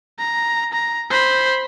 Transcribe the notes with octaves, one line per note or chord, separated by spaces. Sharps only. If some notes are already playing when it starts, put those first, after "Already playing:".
A#5
A#5
C5 B5